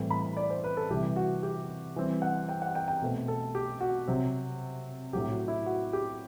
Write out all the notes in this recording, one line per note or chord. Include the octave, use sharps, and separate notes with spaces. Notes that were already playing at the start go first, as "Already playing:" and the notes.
Already playing: A2 E3 G3 C4
B5
D5
C5
B4
A4
C3 E3 G3 G4
F#4
G4
E3 G3 C4
F#5
G5
F#5
G5
G5
B2 A3 C4
A4
G4
F#4
C3 F#3 C4
A2 F#3 C4 G4
F#4
E4
F#4
G4